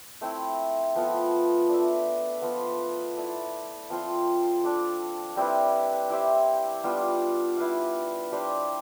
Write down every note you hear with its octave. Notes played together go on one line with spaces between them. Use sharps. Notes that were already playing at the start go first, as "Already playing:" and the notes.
A3 C4 E4
F3 B3 F4 A4
D4 A4 E5
F3 B3 F4 B4
E4 A4 D5
F3 C4 F4 C5
D4 A4 D5
G3 C4 E4 B4
E4 G4 C5 E5
G3 B3 D4 F4
E4 B4 F5
G3 D4 G4 C5